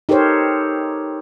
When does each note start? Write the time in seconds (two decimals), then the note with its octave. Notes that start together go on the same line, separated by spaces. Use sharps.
0.09 D#4 G4 A4 A#4 C5 C#5